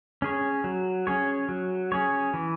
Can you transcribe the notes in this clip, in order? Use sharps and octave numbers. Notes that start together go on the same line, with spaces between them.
C#4 G#4 C#5
F#3
C#4 G#4 C#5
F#3
C#4 G#4 C#5
E3